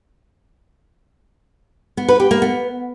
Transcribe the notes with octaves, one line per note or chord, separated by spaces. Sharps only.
B3
B4
G4
A#3
B3